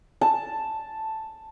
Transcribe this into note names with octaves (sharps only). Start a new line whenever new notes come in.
A5